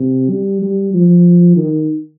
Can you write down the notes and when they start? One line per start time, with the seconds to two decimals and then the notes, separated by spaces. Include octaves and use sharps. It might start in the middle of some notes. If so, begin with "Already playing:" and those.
Already playing: C3
0.30 G3
0.62 G3
0.94 F3
1.57 D#3